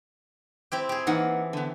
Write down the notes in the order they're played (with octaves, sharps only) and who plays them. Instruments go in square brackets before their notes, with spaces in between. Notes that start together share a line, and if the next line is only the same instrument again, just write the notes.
[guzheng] C4 E4 G4
G4 G#4
[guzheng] E3 [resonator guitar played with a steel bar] A#3 D#4 F#5
[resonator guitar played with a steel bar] D3 B3